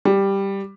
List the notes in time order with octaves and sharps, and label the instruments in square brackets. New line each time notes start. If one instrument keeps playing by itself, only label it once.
[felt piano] G3